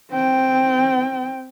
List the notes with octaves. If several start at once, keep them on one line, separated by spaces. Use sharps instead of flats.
C4 G5